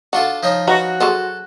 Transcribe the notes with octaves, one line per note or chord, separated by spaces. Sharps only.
D4 F4 F#4 A4
F3 D#4 C#5
F#4 B4 D#5 A#5
F#3 G#4 A4 C5